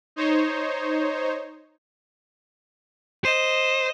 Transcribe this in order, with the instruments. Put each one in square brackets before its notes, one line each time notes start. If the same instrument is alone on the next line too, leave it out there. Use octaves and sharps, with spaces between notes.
[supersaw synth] D#4 C5 C#5
[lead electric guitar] C5 [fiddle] D#5 [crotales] D#7 E7